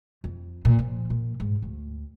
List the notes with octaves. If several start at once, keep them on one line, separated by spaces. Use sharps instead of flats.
F2
A#2
F3
A#2
G#2
D2